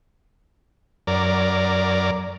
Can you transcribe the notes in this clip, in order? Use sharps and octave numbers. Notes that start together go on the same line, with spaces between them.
F#2 A#4 D5